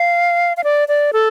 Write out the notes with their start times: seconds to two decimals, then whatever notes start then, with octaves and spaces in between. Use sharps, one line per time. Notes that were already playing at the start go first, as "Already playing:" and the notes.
Already playing: F5
0.57 F5
0.64 D5
0.88 D5
1.13 A4